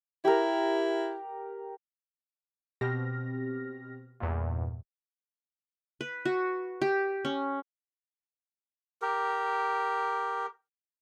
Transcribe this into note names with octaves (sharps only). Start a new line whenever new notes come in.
E4 G4 A#4
B2 C4 G4 F6 A#6
E2 G2 A#2
B4
F#4
G4
C#4
G4 A#4